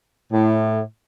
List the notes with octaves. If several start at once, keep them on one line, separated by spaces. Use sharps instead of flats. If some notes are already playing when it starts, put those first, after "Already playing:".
A2